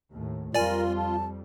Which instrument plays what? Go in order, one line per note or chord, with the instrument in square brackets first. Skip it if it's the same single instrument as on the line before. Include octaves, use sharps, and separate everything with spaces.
[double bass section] D#2 A2
[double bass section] F2 G3 [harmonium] F4 [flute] A#4 [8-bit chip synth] D5 G#5
[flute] A5